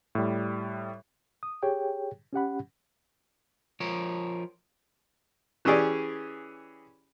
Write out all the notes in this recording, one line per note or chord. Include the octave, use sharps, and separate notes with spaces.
A2 G3
D#6
G4 G#4 C#5 G5
C#4 G4 F#5 B5
F3 A#4 C#5
E3 C#4 G4 G#4 D5